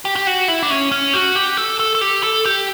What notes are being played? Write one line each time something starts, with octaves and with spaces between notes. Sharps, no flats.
G4
G4
F#4
E4
D4
C#4
C#4
F#4
G4
A4
A4
A4
G4
A4
G4